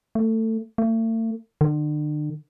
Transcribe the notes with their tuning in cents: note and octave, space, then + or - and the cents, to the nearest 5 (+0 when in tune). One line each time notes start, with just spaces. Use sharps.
A3 +20
A3 +40
D3 +40